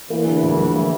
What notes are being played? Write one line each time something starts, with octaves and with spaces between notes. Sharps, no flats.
E2 E3 A#3
D3
D2
F3
A#3